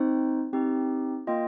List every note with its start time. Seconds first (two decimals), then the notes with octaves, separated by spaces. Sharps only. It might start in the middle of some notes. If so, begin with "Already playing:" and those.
Already playing: C4 D#4 C5
0.53 C4 D#4 G4
1.27 A#3 F4 D#5 G5